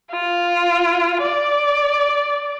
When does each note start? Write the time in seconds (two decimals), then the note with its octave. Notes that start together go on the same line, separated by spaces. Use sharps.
0.12 F4
1.22 D5